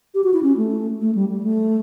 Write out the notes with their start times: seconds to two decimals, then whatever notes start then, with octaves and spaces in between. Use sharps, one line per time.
0.14 G4
0.24 F#4
0.34 E4
0.43 C#4
0.57 A3
1.01 A3
1.15 G3
1.29 G3
1.43 A3